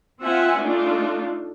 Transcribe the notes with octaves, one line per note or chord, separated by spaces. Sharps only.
C4 F4 E5 F#5 G#5
A3 D4 D#4 F4